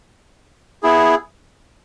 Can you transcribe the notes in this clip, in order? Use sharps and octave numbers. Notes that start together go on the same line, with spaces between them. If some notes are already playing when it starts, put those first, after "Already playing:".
B3 E4 G#4